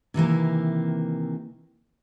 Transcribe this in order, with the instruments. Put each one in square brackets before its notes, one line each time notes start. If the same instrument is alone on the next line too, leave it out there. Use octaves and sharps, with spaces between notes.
[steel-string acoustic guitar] C3 D#3 E3 A#3